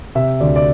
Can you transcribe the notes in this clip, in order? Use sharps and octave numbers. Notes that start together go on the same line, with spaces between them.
C3 E5
D2 D5
D5